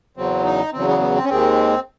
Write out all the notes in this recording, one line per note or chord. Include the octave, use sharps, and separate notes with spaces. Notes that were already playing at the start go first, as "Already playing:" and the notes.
E2 C#3 F#3 C4
D#4
E2 C#3 F#3 C4
B3
B3
C4
C#4
D#2 D#3 G#3 C4